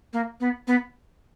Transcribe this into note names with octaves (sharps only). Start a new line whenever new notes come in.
A#3
B3
B3